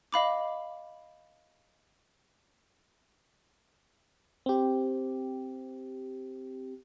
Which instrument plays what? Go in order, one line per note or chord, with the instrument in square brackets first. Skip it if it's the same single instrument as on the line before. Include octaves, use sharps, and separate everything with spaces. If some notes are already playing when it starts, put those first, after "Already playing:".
[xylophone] D#5 F5 B5 D6
[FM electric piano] C4 G4